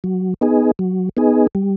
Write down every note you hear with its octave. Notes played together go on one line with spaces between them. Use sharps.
F#3
B3 D#4 G#4
F#3
B3 D#4 G#4
G3